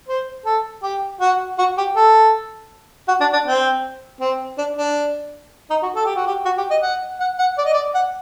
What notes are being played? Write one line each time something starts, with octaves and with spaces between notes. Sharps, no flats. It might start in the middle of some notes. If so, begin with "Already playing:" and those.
C5
A4
G4
F#4
F#4
G4
A4
F#4
D4
D4
C4
C4
D4
D4
D#4
F#4
A4
G4
F#4
G4
F#4
G4
D#5
F#5
F#5
F#5
D5
D#5
D5
F#5